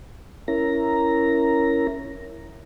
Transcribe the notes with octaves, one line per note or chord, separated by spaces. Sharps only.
C#4 E4 A#4 A#5